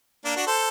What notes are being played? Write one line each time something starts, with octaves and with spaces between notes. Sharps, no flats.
A#3 D4
D4 F#4
A4 C5